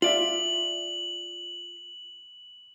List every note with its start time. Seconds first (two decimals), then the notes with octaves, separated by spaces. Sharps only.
0.02 F4 D5 E5 F#7